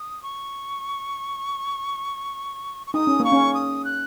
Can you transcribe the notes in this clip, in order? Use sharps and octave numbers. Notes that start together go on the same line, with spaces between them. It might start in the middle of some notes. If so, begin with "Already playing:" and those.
Already playing: D#6
C#6
C#6
D#4 D#6
C#4
A#3 C#6
C#4
D#6
F#6